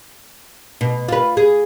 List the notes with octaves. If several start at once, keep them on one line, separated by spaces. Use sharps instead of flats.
B2
F4 B4
G#4